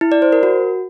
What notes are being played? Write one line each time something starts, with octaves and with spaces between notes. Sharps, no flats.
E4
D5
C5
A#4
F#4